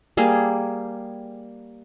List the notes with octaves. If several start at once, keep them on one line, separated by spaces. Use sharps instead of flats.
G3 A#3 G#4